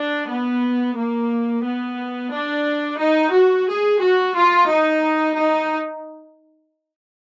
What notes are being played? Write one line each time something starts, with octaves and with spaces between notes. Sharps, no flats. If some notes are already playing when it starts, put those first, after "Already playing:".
Already playing: D4
B3
A#3
B3
D4
D#4
F#4
G#4
F#4
F4
D#4
D#4